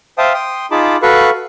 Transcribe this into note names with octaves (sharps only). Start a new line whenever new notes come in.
C5 E5 F5 G5 A5 D#6
G5 C6 D#6
D#4 F4 G#4 A5 B5 D6
F#4 A4 B4 F5 B5 C#6